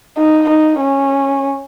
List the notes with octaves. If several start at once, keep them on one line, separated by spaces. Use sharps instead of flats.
D#4
D#4
C#4